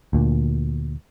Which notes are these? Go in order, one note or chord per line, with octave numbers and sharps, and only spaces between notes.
D2 A#2